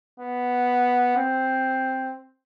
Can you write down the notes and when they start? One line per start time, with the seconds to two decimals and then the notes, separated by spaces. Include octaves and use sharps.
0.20 B3
1.17 C4